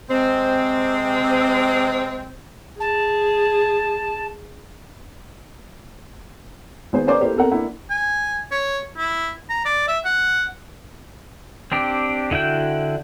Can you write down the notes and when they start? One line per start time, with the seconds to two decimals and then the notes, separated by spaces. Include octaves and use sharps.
0.10 C3 G#3 C4
2.80 G#4 A5
6.93 G#1 B3 G#4 C5
7.07 A#3 C#4 G#4 C5 D5 D6
7.21 A3 A#3 E4 G4 C5
7.36 B3 C4 A4 A#4 F#5
7.51 A#3 D4 E4 F#5
7.90 G#5
8.51 C#5
8.97 E4
9.49 A#5
9.65 D5
9.88 E5
10.05 F#5
11.72 C4 D4 G4
12.31 D3 E4 F#4 G5